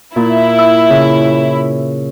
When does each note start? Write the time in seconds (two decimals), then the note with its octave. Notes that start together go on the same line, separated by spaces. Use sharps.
0.16 A#2 E4
0.58 E6
0.90 C#3